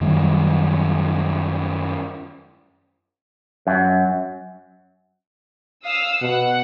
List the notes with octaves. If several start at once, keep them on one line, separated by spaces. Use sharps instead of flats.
F#2 D#3 F#3 G3
F#2
F5 D#6 E6
B2 F#5